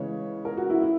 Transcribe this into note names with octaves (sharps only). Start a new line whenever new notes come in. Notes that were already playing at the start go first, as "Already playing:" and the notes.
Already playing: C#3 E3 G#3 C#5
A#4
F#4
E4
E4